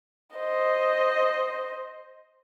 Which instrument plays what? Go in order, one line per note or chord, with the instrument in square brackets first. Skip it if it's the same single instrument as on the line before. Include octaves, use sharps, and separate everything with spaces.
[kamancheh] C5 D#5